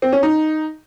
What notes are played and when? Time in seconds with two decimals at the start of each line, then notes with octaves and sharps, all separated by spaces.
0.02 C4
0.13 C#4
0.23 D#4